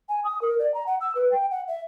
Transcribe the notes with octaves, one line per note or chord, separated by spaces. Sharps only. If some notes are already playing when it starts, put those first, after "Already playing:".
G#5
D#6
A#4
D5
A#5
F#5
E6
B4
G5
F#5
E5